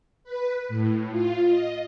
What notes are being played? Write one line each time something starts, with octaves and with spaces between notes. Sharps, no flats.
B4
A2
F4
D#5